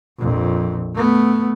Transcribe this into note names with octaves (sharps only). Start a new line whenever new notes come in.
A#1 F2
A3 B3